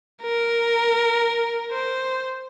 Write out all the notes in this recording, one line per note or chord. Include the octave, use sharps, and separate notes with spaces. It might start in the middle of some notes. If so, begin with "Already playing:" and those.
A#4
C5